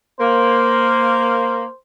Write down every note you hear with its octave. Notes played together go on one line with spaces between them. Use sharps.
A#3 C5